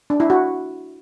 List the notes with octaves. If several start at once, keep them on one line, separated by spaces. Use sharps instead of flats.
D4
E4
F#4